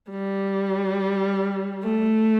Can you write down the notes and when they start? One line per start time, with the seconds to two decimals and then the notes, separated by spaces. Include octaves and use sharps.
0.11 G3
1.83 A3